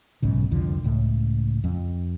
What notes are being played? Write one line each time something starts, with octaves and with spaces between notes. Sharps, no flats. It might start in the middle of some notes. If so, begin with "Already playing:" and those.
B1 G#2 C#3
C2 F2 D3 F3
C#2 A2
F2